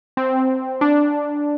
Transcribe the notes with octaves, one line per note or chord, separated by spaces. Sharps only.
C4
D4